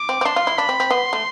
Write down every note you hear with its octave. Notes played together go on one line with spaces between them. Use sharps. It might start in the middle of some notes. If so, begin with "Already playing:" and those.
Already playing: D6
C4
C4
D4 C6
F4
E4
D4 B5
C4
C4
B3 C6
A3